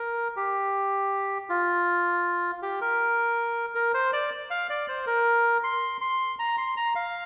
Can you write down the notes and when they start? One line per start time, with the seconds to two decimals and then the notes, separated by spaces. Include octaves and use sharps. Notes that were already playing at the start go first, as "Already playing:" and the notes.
Already playing: A#4
0.36 G4
1.50 F4
2.62 G4
2.81 A#4
3.75 A#4
3.94 C5
4.13 D5
4.50 F5
4.70 D5
4.88 C5
5.07 A#4
5.64 C6
6.01 C6
6.39 A#5
6.58 C6
6.77 A#5
6.95 F5